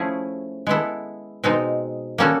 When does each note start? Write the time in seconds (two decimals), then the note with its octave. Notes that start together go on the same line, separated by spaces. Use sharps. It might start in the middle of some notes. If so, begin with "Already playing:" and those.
Already playing: F3 A3 C#4 E4 G#4
0.67 G#3 B3 E4 A4
1.44 B2 G#3 C4 D#4
2.18 G3 A#3 C#4 F#4 A4